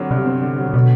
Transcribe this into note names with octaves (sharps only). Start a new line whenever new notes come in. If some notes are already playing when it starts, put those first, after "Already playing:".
Already playing: G2 D3 F#3 C4
G2 C3
C4
D3
F#3
B2 D3